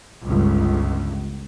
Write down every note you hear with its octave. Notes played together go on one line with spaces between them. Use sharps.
G1 C#2